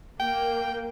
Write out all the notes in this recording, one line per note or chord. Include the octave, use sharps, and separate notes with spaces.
A#3 G5